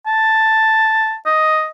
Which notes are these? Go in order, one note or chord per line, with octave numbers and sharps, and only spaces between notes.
A5
D#5